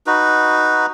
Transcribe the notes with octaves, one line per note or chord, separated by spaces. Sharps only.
D#4 F#4 B4